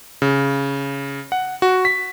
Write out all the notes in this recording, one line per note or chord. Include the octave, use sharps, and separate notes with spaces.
C#3
F#5
F#4
B6